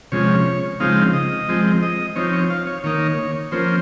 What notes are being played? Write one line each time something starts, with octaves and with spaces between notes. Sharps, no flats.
C3 F3 G#3 C#4 C#5
C#3 F3 G#3 C4 D#4 F5
D#5
F3 G#3 C4
D#5
F3 C4 D#4 C#5
C#5
F5
C#5
D#3 A#3 D#4 C#5
F3 A#3 C#4 C5